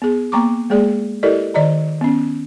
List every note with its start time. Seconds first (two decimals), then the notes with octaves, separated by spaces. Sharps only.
0.02 B3 G#4
0.32 A#3 B3 A#5 C#6 D6
0.70 G#3 A#3 G#4 D5
1.23 E4 G4 A4 A#4 D5 D#5
1.54 D#3 D5 D#5 A#5
2.01 B3 C#4